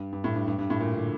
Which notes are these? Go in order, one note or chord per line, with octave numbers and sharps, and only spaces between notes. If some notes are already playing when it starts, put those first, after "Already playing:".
Already playing: G2
G2
A2
G2
G2
G2
A2
A#2
D3